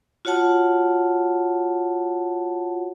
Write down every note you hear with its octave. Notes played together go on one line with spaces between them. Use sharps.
F4 F#4 C#5 F#5 A5